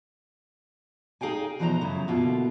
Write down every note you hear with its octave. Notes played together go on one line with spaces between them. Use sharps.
D#4 G#4 F5 G5 G#5
B2 E3 F3 D#4 C5 A#5
F#2 C#3 E4
B2 D3 A#3 E4 F4